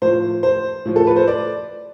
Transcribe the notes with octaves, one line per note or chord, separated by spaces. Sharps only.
A2 F3 C5
C5
A2 F3
A4
B4
C5
D5